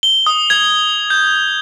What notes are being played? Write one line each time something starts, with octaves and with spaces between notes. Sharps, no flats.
G7
D#6
G#6
G6